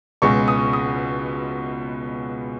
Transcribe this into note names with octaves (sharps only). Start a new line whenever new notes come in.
C#2 B2 G#3 C#6
D#6
D#6